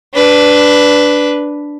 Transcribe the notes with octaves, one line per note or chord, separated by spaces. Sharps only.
D4 B4